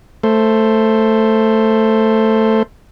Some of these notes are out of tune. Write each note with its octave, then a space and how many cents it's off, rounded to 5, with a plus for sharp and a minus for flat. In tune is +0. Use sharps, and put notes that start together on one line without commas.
A3 +5 C5 +5